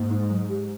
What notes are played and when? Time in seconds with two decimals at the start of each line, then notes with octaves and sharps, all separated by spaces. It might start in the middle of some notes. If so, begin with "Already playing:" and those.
Already playing: G#2 A#3
0.11 D#4
0.30 F#3
0.49 G4